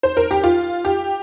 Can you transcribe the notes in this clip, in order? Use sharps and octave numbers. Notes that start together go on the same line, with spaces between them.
C5
A#4
G4
F4
G4